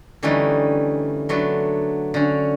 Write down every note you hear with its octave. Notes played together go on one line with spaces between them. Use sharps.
D3 E3 G3 A3 C#4 D#4
F#3 A3 B3 D4
D3 C#4